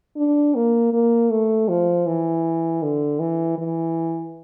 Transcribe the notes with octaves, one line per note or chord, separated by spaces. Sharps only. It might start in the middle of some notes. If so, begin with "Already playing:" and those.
D4
A#3
A#3
A3
F3
E3
D3
E3
E3